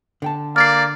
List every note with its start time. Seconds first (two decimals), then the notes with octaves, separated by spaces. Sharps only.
0.22 D3 G5 A5
0.56 A#3 D5 F6 C7